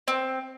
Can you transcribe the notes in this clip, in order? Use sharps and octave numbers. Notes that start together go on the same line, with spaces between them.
C4